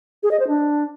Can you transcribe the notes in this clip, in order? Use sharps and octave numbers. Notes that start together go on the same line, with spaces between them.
G#4
D#5
C5
D4